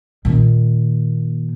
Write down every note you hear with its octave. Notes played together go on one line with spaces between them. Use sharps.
A#2 D#3